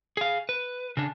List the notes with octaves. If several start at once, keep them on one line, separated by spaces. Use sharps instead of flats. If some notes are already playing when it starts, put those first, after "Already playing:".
G#4 F5
B4
C#3 D4